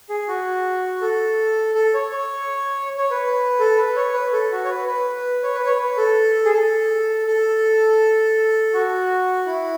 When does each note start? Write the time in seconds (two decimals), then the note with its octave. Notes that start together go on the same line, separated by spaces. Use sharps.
0.09 G#4
0.28 F#4
1.01 A4
1.75 A4
1.94 C#5
2.11 C#5
2.98 C#5
3.10 B4
3.59 A4
3.77 B4
3.96 C#5
4.13 B4
4.33 A4
4.51 F#4
4.64 C#5
4.69 B4
4.87 B4
5.43 C#5
5.55 B4
5.66 C#5
5.79 B4
5.97 A4
6.45 G#4
6.53 A4
7.27 A4
8.74 F#4
9.46 E4